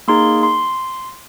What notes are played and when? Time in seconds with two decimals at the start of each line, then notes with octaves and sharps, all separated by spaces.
0.08 A#3 D#4 G#4 C6
0.43 C6